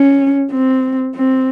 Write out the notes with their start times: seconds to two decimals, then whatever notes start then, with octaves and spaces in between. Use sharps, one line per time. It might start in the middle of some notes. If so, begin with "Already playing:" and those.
Already playing: C#4
0.51 C4
1.16 C4